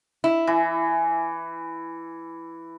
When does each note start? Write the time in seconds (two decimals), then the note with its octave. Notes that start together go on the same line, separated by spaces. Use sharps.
0.24 E4
0.47 E3